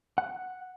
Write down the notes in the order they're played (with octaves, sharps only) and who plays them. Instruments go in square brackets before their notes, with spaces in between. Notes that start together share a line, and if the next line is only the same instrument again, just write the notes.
[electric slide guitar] F#5